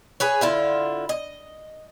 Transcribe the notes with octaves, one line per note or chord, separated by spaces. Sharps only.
G#4 B4 C#5
D3 E4 F4
D#5